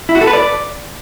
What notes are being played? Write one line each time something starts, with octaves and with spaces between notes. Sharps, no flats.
E4
F#4
A4
B4
D5